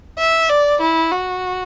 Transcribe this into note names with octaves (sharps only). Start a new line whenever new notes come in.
E5
D5
E4
F#4